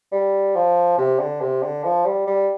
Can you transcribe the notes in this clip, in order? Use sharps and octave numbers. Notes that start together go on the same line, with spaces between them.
G3
F3
C3
D3
C3
D3
F3
G3
G3